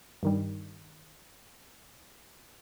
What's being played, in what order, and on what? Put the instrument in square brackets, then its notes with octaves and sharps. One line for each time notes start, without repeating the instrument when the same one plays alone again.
[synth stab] G2 D#3 G3